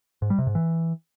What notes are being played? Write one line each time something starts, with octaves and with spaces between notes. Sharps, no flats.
G#2
G3
C3
G#2
E3